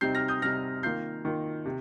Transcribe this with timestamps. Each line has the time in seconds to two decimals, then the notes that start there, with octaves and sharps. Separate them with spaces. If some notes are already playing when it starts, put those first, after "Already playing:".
0.01 C3 G3 C4 D#4 G6 C7
0.15 F6 A#6
0.28 D#6 G6
0.42 C3 G3 C4 D#4 F6 A#6
0.83 D#3 A#3 F4 G6 C7
1.25 D#3 A#3 F4
1.65 C3